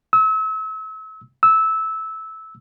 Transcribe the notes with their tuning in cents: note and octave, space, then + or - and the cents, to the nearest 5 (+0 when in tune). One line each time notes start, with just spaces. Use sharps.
E6 -35
E6 -15